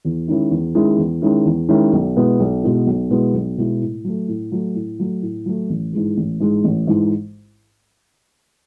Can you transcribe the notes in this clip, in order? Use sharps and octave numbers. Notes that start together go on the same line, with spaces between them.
E2
D#3 G#3 C#4 E4
E2
D#3 G#3 C#4 E4
E2
D#3 G#3 C#4 E4
E2
D#3 G#3 C#4 E4
B1
B2 G#3 B3 E4
B1
B2 G#3 B3 E4
B1
B2 G#3 B3 E4
B1
B2 G#3 B3 E4
A2
F#3 A3
A2
F#3 A3
A2
F#3 A3
A2
F#3 A3
A1
G#2 E3 G#3
A1
G#2 E3 G#3
A1
G#2 E3 G#3